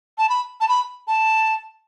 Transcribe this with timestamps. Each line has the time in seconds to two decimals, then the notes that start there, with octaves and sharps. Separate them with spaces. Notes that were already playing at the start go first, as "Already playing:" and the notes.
0.18 A5
0.29 B5
0.61 A5
0.69 B5
1.08 A5